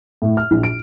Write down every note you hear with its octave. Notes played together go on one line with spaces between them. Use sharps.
A2
F6
A#1
D7